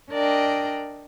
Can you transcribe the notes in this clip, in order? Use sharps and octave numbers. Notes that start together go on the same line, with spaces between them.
D4 A#4 D5 D#5 G5